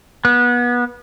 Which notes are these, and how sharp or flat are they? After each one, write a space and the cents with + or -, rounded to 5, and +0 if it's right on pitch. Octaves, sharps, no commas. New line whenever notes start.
B3 -25